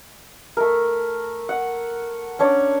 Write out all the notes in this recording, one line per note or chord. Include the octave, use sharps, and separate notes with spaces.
A3 A#4
F#5
C#4 D4 C#5 D5